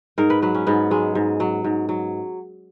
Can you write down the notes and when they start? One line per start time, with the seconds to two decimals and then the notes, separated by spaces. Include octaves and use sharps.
0.18 G#2 A#4
0.30 B4
0.42 F#3 B4
0.55 C#4
0.67 G#2 B3
0.91 F#3 G#3
1.15 G#2
1.40 F#3
1.64 G#2
1.89 F#3